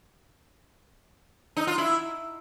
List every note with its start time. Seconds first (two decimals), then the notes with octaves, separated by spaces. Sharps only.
1.57 D#4
1.67 F4
1.78 E4